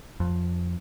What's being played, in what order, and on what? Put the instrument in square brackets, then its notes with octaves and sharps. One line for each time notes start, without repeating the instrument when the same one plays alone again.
[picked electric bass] F2